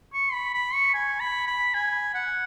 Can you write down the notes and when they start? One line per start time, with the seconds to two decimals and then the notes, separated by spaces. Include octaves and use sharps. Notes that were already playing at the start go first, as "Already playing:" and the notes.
0.13 C#6
0.33 B5
0.54 B5
0.74 C#6
0.94 G#5
1.20 B5
1.47 B5
1.74 G#5
2.14 F#5